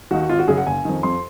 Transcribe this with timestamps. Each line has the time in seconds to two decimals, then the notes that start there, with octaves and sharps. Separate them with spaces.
0.11 D#2 D#3 F#4
0.29 G#1 F4
0.39 F#4
0.48 F#2 C#3 G#4
0.57 F#5
0.67 F#1 G#5
0.85 F2 D#3
1.03 F2 C6